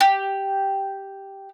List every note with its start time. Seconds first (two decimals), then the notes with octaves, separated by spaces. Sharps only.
0.01 G4